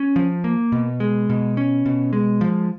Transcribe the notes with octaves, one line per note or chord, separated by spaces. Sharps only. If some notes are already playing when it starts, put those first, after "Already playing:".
Already playing: C#4
F3
A#3
B2
G#3
B2
C#4
B2
G#3
F3